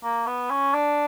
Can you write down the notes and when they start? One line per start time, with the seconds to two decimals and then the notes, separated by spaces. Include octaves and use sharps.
0.03 A#3
0.27 B3
0.50 C#4
0.74 D4